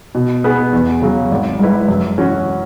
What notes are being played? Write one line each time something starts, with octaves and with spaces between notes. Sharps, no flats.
B2
B3 G#4
E2
C#3 F#3
G#1
G#2 G#3 E4 B4
F#2
E3 C#4 F#4